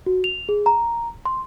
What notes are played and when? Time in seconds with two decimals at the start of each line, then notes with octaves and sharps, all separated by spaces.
0.06 F#4
0.24 F7
0.49 G#4
0.66 A#5
1.26 C6